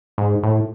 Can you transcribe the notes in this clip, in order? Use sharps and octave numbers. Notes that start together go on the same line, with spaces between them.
G#2
A2